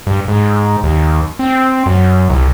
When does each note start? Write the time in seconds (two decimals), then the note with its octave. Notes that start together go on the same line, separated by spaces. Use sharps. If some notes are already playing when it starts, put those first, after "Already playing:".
0.07 G2
0.28 G#2
0.84 D#2
1.39 C4
1.86 F#2
2.30 C2